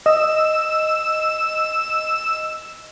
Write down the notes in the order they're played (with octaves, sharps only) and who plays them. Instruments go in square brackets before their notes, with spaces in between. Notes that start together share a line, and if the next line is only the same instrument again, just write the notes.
[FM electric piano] D#5 [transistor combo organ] E6